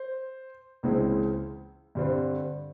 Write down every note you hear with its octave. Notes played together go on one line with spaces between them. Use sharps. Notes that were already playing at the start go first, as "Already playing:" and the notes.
Already playing: C5
C#2 C#3 E3 G#3 C4
G2 D3 G3 C4